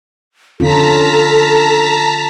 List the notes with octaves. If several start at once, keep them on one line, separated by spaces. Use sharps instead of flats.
D3 C#4 F4 A4 A5 A#5 B6